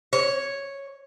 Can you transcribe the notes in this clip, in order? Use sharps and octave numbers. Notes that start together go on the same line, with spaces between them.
C#5